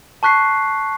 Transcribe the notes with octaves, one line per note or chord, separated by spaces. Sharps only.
A5 C#6 F#6 B6 C7